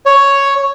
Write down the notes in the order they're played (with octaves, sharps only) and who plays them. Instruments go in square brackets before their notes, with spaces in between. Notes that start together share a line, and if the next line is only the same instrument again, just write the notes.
[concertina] C#5